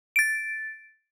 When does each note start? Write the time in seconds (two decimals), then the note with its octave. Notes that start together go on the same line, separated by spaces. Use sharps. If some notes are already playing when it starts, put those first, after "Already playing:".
0.16 A6 D7